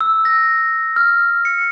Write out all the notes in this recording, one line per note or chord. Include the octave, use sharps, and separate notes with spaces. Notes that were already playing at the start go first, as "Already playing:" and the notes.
E6
A#6
F6
C#7